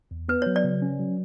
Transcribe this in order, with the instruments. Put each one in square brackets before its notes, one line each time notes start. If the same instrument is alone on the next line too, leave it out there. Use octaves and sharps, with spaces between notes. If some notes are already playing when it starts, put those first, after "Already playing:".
[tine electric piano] E2
[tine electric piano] B3 [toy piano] B4
[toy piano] C#5
[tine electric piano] F#3
[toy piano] D5
[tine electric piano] C#3
C#4
F#3